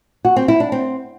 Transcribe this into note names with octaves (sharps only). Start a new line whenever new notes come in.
F#4
C4
E4
D4
C4